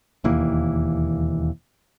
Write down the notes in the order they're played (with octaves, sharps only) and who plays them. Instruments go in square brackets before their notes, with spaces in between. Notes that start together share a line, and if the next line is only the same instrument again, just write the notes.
[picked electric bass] E1 D#2 E3 A#3